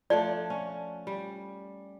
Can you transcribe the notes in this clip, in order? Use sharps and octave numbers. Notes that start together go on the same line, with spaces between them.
F3 A3 D4 D5
C#4
G3